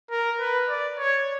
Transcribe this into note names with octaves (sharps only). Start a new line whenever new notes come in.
A#4
B4
D5
C#5